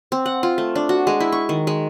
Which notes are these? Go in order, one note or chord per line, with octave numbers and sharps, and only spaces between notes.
C4
F#5
F4
A3
D4
F#4
G#3
E4
C#6
D#3
G#3